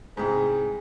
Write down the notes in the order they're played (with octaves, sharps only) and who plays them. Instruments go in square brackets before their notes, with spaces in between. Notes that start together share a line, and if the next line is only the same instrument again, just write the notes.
[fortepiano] C2 G#2 [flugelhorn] G#4